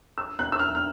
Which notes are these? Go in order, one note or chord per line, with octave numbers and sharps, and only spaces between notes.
E6
F#6
E6
F6
F6